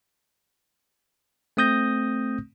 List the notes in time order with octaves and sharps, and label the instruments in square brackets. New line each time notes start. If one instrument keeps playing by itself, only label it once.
[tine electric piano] A3 C4 D#6 G6 A#6